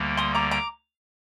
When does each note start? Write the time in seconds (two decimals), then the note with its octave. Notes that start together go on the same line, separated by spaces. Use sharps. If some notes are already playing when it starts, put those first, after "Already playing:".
Already playing: D2 D3 G3 A#3
0.17 C6 D#6
0.35 A#5 D6
0.51 A#5 D6